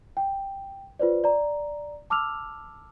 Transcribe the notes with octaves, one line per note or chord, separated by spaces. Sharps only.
G5
F4 B4 C5 D5
D5 A#5
A5 D6 E6 F6 F7